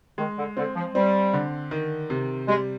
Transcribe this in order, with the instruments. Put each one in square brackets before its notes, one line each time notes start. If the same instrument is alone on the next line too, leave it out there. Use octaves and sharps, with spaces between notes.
[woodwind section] D#3 [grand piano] G#3
[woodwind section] D3
[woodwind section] D3 [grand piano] C4
[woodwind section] F3
[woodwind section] G3 [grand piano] C4
[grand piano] D3
D#3
C3
[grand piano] G3 [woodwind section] G#3